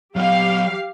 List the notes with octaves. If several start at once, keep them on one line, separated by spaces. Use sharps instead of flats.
F#3 G4 D#5 F5